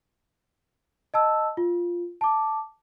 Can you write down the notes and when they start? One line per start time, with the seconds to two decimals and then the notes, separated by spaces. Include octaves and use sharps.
1.14 D#5 A5 E6
1.57 F4
2.21 A5 D6